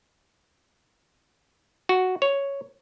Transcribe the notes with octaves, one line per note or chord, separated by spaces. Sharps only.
F#4
C#5